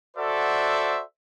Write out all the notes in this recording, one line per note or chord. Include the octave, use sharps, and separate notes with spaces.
F#4 A4 C5 D5 E5 F#5